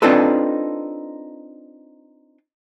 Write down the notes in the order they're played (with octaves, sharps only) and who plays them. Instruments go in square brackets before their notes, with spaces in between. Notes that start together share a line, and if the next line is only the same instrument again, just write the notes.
[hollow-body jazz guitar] C4 D4 D#4 F4 A4 B4